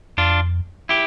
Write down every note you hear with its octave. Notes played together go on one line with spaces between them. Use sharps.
F2 D4 F4
E4 G4